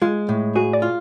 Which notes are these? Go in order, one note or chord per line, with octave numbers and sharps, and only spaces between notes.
G#3 F4
A2
F#4 G#4
D5
F4